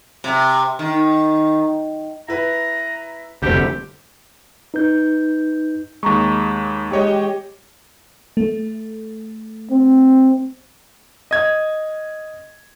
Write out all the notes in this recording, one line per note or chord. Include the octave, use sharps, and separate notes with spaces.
C3
D#3
E4 B4 A#5
F1 D2 G3 A3 C4 G4
D#4 B4 G6
D#2 G#3 A#5 C#6
G#3 G4 C#5 D#5
A3
C4
D#5 G#6